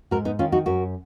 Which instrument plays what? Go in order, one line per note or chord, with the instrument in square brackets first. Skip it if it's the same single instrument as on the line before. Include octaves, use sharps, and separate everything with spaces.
[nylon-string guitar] G#2 F#4 A#4
B3 D#4
D#3 C#4 F4
D#4 F#4
F#2 F#4 A#4